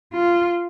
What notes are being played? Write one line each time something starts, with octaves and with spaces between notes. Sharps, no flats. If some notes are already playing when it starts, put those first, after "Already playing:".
F4